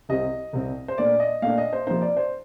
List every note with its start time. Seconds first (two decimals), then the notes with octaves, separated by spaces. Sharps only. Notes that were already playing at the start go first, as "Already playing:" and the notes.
0.09 C2 C3 G3 C4 D#5
0.53 C2 C3 G3 C4
0.88 C5
0.98 A#2 A3 D4 D5
1.20 D#5
1.42 A#2 A3 D4 F5
1.58 D#5
1.73 C5
1.87 C3 F3 A#3 D#4 C5
2.02 D5
2.17 C5